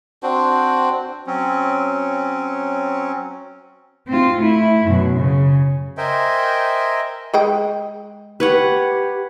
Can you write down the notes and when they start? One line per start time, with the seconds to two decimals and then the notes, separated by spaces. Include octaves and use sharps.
0.23 C4 D4 F#4 C5
1.27 F#3 C4 C#4
4.08 C4 F4
4.38 A3 E4
4.86 F#2 B2
5.16 C#3
5.97 A#4 C5 D#5 E5 G5 G#5
7.34 G#3 D#5 G5
8.40 G4 B4 C#5 F#5